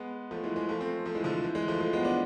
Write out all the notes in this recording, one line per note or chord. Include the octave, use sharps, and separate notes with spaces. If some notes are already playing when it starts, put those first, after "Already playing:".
Already playing: G#3 B3
F3 A3
E3 G#3
E3 G#3
F3 A3
A3 C4
F3 A3
E3 G#3
D3 F3
E3
E3 G#3
F3 A3
F3 A3
G#3 B3
B3 D4